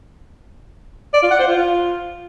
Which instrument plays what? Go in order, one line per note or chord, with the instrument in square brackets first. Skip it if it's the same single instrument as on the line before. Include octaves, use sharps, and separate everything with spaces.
[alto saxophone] D5
F4
F#5
C5
F4